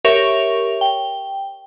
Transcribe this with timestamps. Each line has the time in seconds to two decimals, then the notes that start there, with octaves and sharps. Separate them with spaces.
0.05 G4 A#4 C#5 E5 C#6 F7
0.81 G5